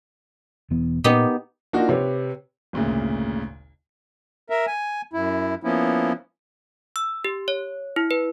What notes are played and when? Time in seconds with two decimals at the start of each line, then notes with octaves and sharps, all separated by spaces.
0.70 E1 E3 B3
1.04 A#2 B3 D#4 G4
1.73 A#3 D4 D#4 F4 F#4
1.89 C3 G4 B4 C#5
2.73 G#1 D2 A#2 C#3
4.50 A#4 E5
4.67 G#5
5.13 F#2 E4
5.64 F3 A#3 B3 C#4 E4
6.96 E6
7.25 G4
7.48 C#5
7.96 E4
8.11 B4